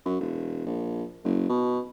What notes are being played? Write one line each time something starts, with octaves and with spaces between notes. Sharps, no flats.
F#2
E1
A#1
F#1
B2